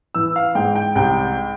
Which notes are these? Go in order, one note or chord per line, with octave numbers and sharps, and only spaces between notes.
E3 E6
F5
G#2 G5
G5
C2 G5